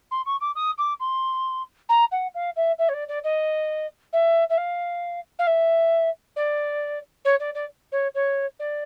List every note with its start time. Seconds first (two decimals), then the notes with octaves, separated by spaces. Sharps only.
0.11 C6
0.26 C#6
0.41 D6
0.55 D#6
0.78 D6
1.00 C6
1.89 A#5
2.12 F#5
2.34 F5
2.56 E5
2.78 E5
2.89 C#5
2.93 D5
3.08 D5
3.24 D#5
4.13 E5
4.50 E5
4.57 F5
5.39 F5
5.47 E5
6.36 D5
7.25 C#5
7.40 D5
7.55 D5
7.92 C#5
8.14 C#5
8.59 D5